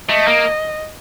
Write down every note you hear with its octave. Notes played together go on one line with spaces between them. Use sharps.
A3 D#5
A#3